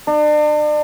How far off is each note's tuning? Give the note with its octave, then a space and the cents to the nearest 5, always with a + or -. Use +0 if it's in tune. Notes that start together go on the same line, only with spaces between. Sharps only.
D4 +40